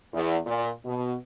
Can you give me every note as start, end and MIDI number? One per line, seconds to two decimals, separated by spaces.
0.14 0.38 40
0.46 0.70 46
0.85 1.15 47